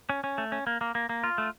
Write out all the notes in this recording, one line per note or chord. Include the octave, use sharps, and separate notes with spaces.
C#4
C#4
A3
C#4
A#3
A#3
A#3
A#3
F4
A3